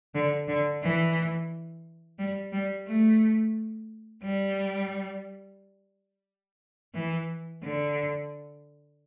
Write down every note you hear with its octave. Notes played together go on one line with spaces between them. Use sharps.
D3
D3
E3
G3
G3
A3
G3
E3
D3